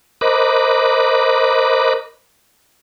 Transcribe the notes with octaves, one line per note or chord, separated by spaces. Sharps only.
A#4 C5 D#5 B5 D6 F#6